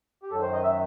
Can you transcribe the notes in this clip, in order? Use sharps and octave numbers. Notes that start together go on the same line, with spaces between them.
G4
F#2 D#3 F#3 A4
C5
D#5
E5